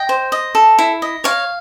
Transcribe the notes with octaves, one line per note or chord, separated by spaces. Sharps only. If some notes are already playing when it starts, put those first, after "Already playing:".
Already playing: D#5 G5
C5
D#5
A4
E4
D#5
C#5 F5